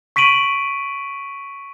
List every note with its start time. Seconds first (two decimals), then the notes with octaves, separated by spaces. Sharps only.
0.16 C#6 B6 D7 D#7 F#7